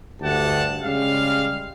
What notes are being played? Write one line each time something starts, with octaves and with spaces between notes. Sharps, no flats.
D2 G2 G4 F#5 A5
C#3 G3 G#3 F5